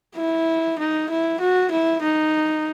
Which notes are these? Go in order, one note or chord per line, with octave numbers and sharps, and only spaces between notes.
E4
D#4
E4
F#4
E4
D#4